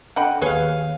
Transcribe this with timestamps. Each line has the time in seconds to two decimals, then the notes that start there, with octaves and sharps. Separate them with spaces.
0.16 D3 D#5 F#5 G5 B5
0.42 D#2 G#4 B4 C#5 F5 G#5